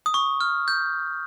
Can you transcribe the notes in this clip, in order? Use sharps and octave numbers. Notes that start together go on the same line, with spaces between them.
D#6
C#6
F6
G6